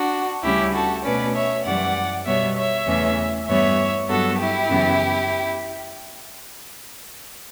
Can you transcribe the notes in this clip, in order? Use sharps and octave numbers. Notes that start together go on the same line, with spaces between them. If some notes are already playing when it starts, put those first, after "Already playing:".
Already playing: D4 F#4
D2 C#3 G3 C#4 E4 G4
F#4 A4
B2 A3 C#4 B4 D5
C#5 E5
F#2 E3 G3 D5 F#5
B2 G3 B3 C#5 E5
C#5 E5
E2 C#3 E3 A3 C#4
G2 E3 G3 B3 C#5 E5
G2 F#3 B3 F#4 A4
E4 G4
F#2 C#3 E3 B3